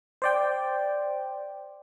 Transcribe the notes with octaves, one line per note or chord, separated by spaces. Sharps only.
C5 D5 G5